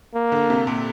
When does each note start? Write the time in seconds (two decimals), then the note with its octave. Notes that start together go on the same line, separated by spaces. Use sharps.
0.15 A#3
0.32 D3
0.50 C3
0.67 A#2